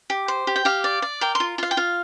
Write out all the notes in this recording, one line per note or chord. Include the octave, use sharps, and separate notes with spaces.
G4
C5
G4
G5
G4 F5
D5
D5
A#4 G5
C6
F4
F4 F5
G5
F4 F5